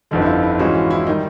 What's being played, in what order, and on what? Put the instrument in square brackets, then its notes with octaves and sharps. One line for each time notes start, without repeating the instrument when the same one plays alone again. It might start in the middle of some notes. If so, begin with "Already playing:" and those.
[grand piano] G1 F2 D3 [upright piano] D#4
[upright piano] E4
F4
E4
[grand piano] G#2 E3 G#3 C#4 [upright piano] F#4
[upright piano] F4
E4
[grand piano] D#3 G3 [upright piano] D#4